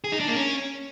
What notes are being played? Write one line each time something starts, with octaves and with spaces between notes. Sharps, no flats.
G#4
D#4
D4
A#3
C#4